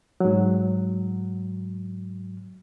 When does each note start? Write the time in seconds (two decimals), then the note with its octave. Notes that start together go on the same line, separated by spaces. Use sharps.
0.20 G#2 F#3